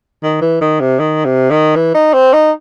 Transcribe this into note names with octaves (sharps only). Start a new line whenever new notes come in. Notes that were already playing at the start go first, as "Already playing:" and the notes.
D#3
E3
D#3
C3
D#3
C3
D#3
E3
D#4
C4
D#4